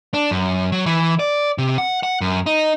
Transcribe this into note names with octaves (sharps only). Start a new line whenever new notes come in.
D4
F#2
F#3
E3
D5
C3
F#5
F#5
F#2
D#4